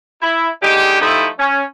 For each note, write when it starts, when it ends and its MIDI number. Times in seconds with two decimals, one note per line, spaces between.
0.22 0.49 64
0.62 0.98 50
0.62 0.98 56
0.62 0.98 63
0.62 0.98 67
1.01 1.28 53
1.01 1.28 55
1.01 1.28 57
1.01 1.28 63
1.01 1.28 64
1.38 1.62 61